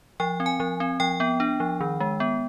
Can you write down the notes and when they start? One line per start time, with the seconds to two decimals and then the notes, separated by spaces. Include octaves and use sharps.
0.20 F3 G5
0.40 C4
0.46 G#5
0.60 F3
0.80 C4
1.00 F3 G5
1.20 B3
1.40 D4
1.60 F3
1.81 D#3
2.00 G#3
2.20 B3